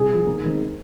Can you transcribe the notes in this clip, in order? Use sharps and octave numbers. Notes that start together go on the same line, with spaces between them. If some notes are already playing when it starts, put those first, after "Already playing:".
Already playing: C2 G#4
C3 F3
D#2 A#4
D#3 G#3 C4